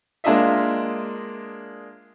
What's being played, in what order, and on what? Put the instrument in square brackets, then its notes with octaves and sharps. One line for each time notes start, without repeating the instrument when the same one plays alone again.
[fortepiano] G#3 A#3 D4 F4 D#5 E5